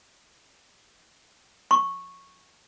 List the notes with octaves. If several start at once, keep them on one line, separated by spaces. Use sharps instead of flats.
C#6